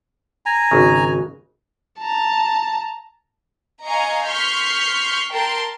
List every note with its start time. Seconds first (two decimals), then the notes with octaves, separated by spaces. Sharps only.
0.46 G#5 A#5
0.71 G#1 C#3
2.00 A5 A#5
3.85 D#5 F5 G#5 A#5 C#6
4.27 C6 C#6 F6 G6 B6 C7
5.32 A#4 G5 A5 C6